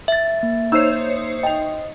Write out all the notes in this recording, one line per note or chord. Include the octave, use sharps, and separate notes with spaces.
E5 A6
A#3
D#4 C5 C#5 E6 C7
D#5 G5 F7